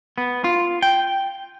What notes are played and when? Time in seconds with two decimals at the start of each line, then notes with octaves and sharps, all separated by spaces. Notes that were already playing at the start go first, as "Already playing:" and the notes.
0.18 B3
0.44 F4
0.82 G5